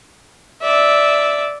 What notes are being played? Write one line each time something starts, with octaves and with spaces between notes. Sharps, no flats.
D5 E5